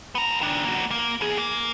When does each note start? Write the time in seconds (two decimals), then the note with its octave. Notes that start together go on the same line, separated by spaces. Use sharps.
0.15 B3 A#5
0.41 D#3 D4
0.65 A#3 F#4
0.91 A#3
1.21 E2 G#4
1.38 A#3